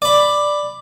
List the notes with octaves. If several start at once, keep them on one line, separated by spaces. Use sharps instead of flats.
D5 B5